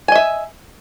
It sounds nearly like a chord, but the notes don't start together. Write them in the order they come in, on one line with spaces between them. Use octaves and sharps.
G#5 D#5 E5